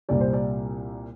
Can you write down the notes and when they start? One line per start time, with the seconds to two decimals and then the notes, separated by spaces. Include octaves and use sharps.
0.09 C2 A#2 G3 D5
0.20 C5
0.33 D5